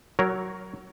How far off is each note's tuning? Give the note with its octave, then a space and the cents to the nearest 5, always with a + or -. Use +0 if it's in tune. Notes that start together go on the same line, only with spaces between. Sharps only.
F#3 +15 A#4 +0 C#5 +0